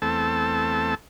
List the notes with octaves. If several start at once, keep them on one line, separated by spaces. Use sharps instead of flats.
E2 A3 C4 A4 A5